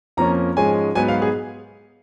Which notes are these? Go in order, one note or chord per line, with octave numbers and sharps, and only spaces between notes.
F2 F3 A#3 C#4 A#5
G#2 F3 G#3 C#4 G#5
G#2 F#3 B3 G#5
F5
G#4